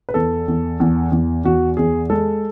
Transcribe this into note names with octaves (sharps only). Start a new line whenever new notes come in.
B4
E2 A4
E2
E2
E2
E2 F#4
E2 G#4
G#3 A4